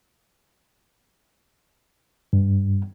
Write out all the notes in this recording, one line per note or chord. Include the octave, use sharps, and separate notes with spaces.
G2